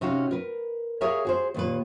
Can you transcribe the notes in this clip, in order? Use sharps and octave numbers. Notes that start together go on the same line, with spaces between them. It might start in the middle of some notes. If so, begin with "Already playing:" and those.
C3 C#4 D#4 F#4 F5
A#4 B4
G#4 A#4 C#5 E5 F5
F#4 G#4 C5
D#2 A#2 B4